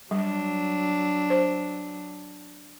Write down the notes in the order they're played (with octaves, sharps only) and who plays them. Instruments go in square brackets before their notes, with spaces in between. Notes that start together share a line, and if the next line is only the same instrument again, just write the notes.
[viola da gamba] F#3 D4 [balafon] G3
[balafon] C5